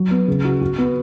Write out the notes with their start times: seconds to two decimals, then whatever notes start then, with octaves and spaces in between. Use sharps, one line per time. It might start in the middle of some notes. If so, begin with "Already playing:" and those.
Already playing: F#3
0.11 B3
0.28 C#3
0.45 F#4
0.61 F#4
0.78 B3